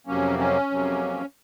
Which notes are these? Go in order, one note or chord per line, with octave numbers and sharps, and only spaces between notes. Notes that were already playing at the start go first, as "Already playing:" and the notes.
F2 C3 F#3 A#3 C#4
C#4
F2 C3 F#3 A#3